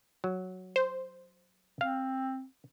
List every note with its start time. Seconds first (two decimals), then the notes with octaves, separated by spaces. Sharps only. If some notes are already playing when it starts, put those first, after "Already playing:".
0.24 F#3
0.76 C5
1.81 C4 F5